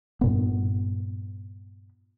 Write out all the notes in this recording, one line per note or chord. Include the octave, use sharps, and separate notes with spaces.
G2 A#2 B3